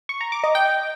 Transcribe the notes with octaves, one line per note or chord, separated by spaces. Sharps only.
C#6
A#5
D6
D#5
G5